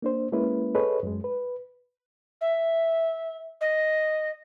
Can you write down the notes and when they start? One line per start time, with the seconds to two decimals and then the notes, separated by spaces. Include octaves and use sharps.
0.02 A#3 D4 C5
0.32 G#3 A#3 C#4 E4 B4
0.75 G#4 A4 B4 C#5 D#5
1.03 F#2 G#3
1.24 B4
2.41 E5
3.61 D#5